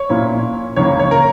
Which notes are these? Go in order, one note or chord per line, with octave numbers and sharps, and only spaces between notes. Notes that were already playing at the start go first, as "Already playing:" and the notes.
Already playing: C#5
A#2 A#3 C#4 E4
C#2 C#3 E3 A#3 C#5
C#5
A#4